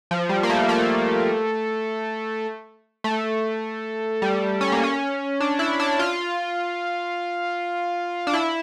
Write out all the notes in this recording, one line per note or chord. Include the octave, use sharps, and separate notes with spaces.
F3
G3
A#3
A3
A3
A3
G3
C#4
A#3
C#4
D4
E4
D4
F4
D4
E4